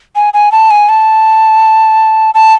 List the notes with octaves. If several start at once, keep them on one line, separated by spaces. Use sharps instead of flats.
G#5
G#5
A5
G#5
A5
A5